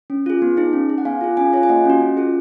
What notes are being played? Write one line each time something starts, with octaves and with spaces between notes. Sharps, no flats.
C#4
F4 G#4
B3
D#4 G#4
C#4
G#4
F#5
B3 F5 G#5
F4 G#4
C#4 F5 G#5
F4 G#4 C#5 F5
G#5
A#3 D#5 F#5
C#4 F#4
C#4
F4 G#4